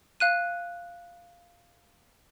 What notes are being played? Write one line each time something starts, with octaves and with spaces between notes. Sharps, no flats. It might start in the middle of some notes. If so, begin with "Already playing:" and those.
F5 F#6 D#7